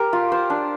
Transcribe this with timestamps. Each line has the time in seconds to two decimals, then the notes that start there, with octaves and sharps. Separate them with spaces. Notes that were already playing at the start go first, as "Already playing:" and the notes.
Already playing: G4 A#4
0.13 F4
0.32 C5
0.50 D4